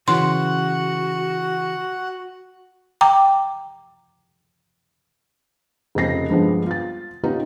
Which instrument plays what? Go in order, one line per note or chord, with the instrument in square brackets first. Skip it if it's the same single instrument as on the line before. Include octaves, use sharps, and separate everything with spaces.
[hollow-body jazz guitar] C#3 E3 [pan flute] F#4 [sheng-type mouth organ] F#5 [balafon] C6
[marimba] G5 A#5 D6
[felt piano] F1 C#3 F3 A#6 C7
G2 F3 G#3 B3
F4 A6
B3 C#4 D#4 F4 G4 B4